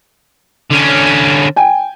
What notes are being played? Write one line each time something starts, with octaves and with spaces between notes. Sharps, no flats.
D3 C#4
G5 G#5